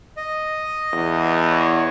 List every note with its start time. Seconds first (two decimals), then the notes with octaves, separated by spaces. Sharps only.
0.17 D#5
0.93 E2
1.50 C#5